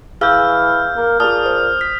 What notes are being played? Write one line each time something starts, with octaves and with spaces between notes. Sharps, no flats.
E3 G#4 F5 E6 F6 G6
A#3
A#2 G#4 A5 D#6 F6
C5
B6